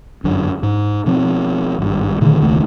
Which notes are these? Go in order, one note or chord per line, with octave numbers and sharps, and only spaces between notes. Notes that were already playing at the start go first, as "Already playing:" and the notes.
G1 F#2 D4
G#2
B2 F3 C4
G#1 G2
A#2 D3 D#3 A3
E1 C#2 D#3 A3